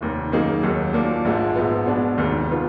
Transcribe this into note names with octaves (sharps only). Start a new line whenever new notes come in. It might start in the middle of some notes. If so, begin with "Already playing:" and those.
F1 D#2 D#3
F#2 D#3 A#3 D#4 G#4
D#2 D#3 F#3
A#2 F3 A#3 D4
A#1 G#2 F3 G#3
A#1 G#2 F3 B3
B2 G#3 D4
F1 D#2 D#3
F3 B3 F4